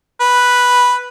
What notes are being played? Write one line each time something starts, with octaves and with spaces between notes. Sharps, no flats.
B4